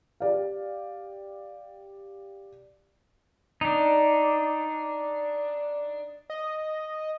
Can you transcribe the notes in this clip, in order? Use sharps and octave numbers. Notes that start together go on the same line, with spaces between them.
G4 D5 F5
D4 D#4
D#5